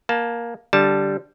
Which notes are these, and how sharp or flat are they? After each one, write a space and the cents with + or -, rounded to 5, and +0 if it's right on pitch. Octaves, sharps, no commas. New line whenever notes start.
A#3 +10 A5 +0
D3 +0 G3 +0 A5 +0